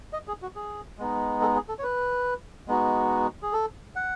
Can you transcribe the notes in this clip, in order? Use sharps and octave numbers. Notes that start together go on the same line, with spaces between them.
D#5
G#4
F#4
G#4
G#3 B3 D#4
A4
G#4
A4
C#5
B4
G#3 B3 D#4 F#4
G#4
A4
F#5